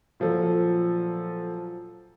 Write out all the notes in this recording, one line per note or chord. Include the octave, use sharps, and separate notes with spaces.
A#2 F3 F#3 A4